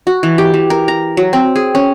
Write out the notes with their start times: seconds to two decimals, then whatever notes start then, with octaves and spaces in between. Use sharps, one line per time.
0.07 F#4
0.23 E3
0.38 G4
0.54 E3
0.70 A#4
0.88 A#5
1.17 F#3
1.33 C4
1.56 G#4
1.75 C#4